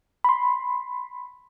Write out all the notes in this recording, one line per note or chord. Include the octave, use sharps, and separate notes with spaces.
B5 C6